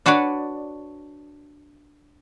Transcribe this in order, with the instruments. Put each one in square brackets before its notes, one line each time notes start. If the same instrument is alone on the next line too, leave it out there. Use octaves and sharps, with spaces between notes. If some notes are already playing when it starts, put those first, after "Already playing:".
[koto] D4 F#4 B4 C#5 D5